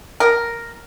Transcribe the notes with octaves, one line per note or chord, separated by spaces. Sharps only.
A#4